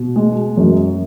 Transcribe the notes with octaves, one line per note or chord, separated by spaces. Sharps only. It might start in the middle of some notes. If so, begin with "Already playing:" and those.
Already playing: B2
G#3
F#2